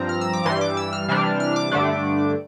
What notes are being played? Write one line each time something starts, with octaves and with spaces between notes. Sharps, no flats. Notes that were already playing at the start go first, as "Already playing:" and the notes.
Already playing: G2 F3 C4 A#5
F6
E6
D6
G2 E3 G3 C6
D6
E6
F6
C3 E3 G3 D4
F6
D6
G2 D3 A3 D4